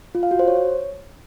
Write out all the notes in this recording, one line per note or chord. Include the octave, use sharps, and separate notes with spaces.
F4
F5
F#4
C5
C#5